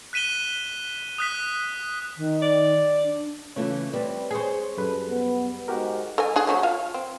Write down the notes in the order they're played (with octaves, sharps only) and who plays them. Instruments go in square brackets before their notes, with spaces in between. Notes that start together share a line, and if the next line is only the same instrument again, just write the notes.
[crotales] F#6 B6 D#7 E7 G7
D#6 F#6 B6
[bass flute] D#3
[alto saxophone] D5
[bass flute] D4
[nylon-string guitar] C#3 A3 F4 [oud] E3 [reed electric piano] C#5
[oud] G3 [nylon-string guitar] C4 B4
[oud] G#4 C5 [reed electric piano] G#5 C#6
[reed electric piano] F#2 B4 [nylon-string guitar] G3 [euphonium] A4
[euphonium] B3
[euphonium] G#2 [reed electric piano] F#4 G4 A#4
[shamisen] A4 D#5 G#5
D4 G#4
F3 F#3 A3
F4 F5
C4